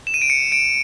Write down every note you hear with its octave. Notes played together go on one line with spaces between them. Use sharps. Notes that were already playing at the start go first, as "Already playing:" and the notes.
E7
D#7
D7
C#7
D7